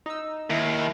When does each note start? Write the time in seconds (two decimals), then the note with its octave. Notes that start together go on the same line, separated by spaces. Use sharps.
0.06 D#4 E6
0.50 D#2 E4 A#4